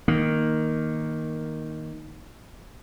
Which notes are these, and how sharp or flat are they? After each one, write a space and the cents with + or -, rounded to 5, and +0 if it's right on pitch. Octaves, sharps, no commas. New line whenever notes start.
D#3 +0 A#3 +0